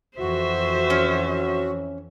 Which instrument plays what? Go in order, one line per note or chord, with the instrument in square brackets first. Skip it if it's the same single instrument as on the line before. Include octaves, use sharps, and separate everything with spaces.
[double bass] F2 E3 [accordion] F#4 [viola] C5 E5
[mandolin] C#4